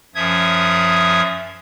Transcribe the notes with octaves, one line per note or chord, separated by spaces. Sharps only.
F#2 F3 E5 D#6 G#6